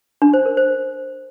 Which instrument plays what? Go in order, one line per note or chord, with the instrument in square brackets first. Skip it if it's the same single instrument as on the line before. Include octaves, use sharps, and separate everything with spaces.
[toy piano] D4
C5
A#4
C5